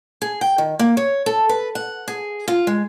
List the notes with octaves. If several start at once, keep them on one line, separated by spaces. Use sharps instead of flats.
G#4
G5
D#3
A#3
C#5
A4
B4
F#5
G#4
F4
G#3